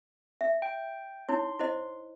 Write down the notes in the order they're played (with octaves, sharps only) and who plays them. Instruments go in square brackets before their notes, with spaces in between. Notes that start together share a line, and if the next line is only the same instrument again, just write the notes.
[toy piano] E5
[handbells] G5
[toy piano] D#4 E4 C#5 [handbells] C6
[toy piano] E4 C5 D#5